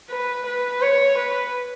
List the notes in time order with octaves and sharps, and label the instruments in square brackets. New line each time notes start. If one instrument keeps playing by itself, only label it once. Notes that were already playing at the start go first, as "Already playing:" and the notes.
[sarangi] B4
B4
C#5
B4